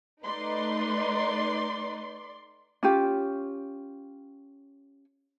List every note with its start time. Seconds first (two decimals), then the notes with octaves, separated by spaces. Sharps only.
0.23 A3 D#4 B4 D5 C6
2.83 C#4 F4 G4